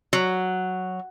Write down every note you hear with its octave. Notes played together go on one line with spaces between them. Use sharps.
F#3